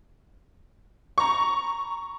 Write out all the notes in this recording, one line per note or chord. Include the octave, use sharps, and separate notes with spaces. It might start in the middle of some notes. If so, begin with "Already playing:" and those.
A#5 B5 C#6